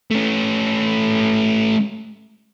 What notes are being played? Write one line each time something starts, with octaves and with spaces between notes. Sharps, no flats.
A3 C#4